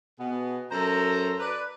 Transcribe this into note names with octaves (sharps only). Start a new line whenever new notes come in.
B2 B3 G#4
F#2 A4 C5 A#5
B4 D5